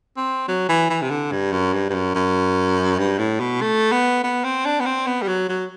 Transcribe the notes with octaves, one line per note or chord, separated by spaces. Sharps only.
C4
F#3
E3
E3
C3
D3
G2
F#2
G2
G2
F#2
F#2
G2
A2
B2
A3
B3
B3
C4
D4
B3
C4
B3
G3
F#3
F#3